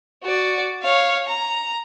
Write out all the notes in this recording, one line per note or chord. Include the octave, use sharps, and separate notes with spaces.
F#4 D5
C#5 F5
A#5